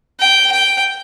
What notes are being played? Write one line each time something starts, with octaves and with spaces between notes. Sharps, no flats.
G5
G5